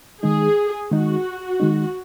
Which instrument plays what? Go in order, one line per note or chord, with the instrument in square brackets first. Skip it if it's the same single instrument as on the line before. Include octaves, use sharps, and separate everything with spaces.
[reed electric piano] D#3 G#3 D#4 [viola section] G#4
[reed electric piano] D#3 G#3 D#4 [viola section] F#4
[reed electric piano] D#3 G#3 D#4